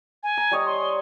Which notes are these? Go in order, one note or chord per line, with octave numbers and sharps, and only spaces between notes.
G#5
A#5
G3 C#5 D#5
C6